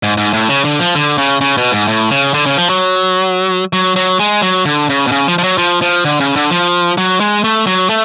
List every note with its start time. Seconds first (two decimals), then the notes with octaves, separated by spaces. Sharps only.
0.03 G#2
0.17 G#2
0.33 A2
0.49 C#3
0.64 D3
0.79 F3
0.95 D3
1.18 C#3
1.41 C#3
1.57 B2
1.72 G#2
1.88 A2
2.11 C#3
2.34 D3
2.46 C#3
2.57 F3
2.69 F#3
3.73 F#3
3.96 F#3
4.20 G#3
4.42 F#3
4.65 D3
4.89 C#3
5.07 B2
5.12 C#3
5.28 F3
5.38 F3
5.43 F#3
5.58 F3
5.82 F3
6.05 D3
6.20 C#3
6.36 D3
6.50 F3
6.98 F#3
7.20 G#3
7.44 A3
7.67 F#3
7.89 A3